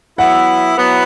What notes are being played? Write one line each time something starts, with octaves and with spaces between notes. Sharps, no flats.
F#3 B3 E4 F#5
F#3 B3 E4